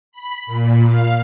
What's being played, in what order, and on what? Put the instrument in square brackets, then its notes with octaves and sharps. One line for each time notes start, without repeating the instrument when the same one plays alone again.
[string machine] B5
A#2
F5